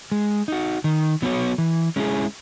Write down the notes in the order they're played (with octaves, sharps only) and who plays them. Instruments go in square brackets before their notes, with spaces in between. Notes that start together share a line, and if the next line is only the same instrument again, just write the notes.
[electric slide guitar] G#3
D#4 F#4
D#3
F#3 B3 F#4 C#5
E3
G#3 C#4 E4 G#4